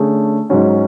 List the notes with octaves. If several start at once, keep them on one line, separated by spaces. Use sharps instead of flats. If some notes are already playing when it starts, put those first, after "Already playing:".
Already playing: D3 A3 C#4 G#4
G#2 F#3 C#4 F#4